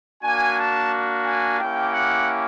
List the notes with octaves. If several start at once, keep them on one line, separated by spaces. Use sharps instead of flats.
A#3 D4 F#4 G#5
A5
G#5
A#3 C#4 E4 G4 G5
F#5